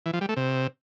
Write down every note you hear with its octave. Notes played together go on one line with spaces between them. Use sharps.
E3
F3
G3
A3
C3